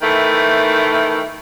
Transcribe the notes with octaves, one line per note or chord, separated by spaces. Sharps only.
D#3 E3 A3